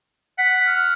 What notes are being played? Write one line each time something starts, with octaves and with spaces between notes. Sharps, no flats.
F#5 B6
F6